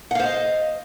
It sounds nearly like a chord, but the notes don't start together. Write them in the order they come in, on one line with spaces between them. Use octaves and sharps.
F#5 F5 C5 D#5